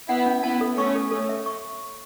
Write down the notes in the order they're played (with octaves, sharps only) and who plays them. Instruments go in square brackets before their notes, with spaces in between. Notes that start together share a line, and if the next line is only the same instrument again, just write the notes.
[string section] B3 E4 [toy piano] F#5
[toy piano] C#4
[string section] B3 E4 [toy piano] A5
[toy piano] A4
[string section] A3 C#4 [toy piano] C#6
[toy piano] A4
[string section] A3 C#4 [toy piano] A4
[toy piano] E5
C#6